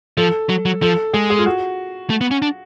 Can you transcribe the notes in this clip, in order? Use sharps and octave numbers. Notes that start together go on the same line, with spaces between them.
F3 A4
F#3
F#3
F3 A4
G#3 G#4
G#4
F4
F#4
A3
B3
C#4
D4